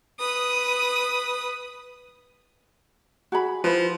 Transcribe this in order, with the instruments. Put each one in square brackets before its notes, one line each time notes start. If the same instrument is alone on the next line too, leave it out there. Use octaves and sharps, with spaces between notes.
[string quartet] B4 D#6
[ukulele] F#4 G#4 B5
[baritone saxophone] F3 [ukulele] E4 B4